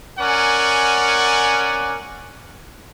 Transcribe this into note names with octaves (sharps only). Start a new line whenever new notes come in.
C#4 A#4 D5 F#5 G#5